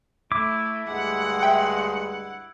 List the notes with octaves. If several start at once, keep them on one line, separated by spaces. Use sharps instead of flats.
A3 E4 D6
D2 G2 G#3 F#5
E5 G5